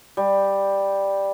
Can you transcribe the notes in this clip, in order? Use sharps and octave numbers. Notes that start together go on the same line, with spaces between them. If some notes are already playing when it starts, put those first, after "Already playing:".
G3